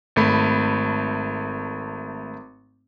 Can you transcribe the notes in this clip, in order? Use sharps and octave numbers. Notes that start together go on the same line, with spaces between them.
G#1 A3 B5